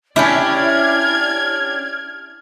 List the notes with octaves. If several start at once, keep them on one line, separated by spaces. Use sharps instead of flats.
C#4 D4 E4 G4 D5 F6 G#6